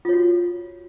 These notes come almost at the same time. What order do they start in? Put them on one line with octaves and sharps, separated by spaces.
F4 C#5 F#4